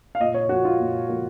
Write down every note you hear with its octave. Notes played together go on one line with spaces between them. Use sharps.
F5
A#2 D#5
C#5
F3 A#3 F#4
F4
A#2
F3 A#3